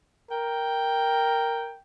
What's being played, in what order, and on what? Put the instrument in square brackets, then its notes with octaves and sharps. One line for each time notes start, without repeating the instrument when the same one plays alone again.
[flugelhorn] A#4 [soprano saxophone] G5